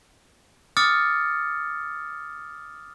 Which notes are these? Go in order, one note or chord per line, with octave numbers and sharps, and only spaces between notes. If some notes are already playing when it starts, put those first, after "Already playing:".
D6 D#6 F6 A6 C#7